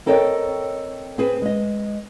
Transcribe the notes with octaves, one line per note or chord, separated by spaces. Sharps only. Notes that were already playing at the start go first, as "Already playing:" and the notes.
C4 A4 A#4 C#5 D#5 G5
C4 G#4 B4
G#3 D#5